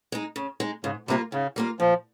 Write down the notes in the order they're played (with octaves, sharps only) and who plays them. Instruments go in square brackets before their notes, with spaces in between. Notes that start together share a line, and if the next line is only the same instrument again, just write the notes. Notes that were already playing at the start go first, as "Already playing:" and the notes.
[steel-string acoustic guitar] G#3 D#4
C#3
G#3 D#4
[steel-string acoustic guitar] G#2 [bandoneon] C#3
[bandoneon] C3 [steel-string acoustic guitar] G3 A#3 F4
[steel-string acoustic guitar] G#2 [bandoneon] C#3
[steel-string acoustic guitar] G3 A#3 F4
[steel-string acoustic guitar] A#2 [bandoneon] F3